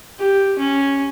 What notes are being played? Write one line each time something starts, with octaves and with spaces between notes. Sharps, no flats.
G4
C#4